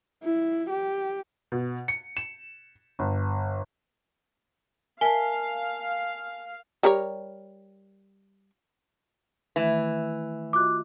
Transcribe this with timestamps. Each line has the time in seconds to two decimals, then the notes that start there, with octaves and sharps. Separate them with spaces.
0.23 E4
0.70 G4
1.52 B2
1.88 C#7
2.17 E7
2.99 G1
5.01 A#4 E5 F5 G#5 A5
6.83 G3 A#4 C#5
9.56 D#3 E3 A3
10.53 F4 F#4 D#5 D6 F#6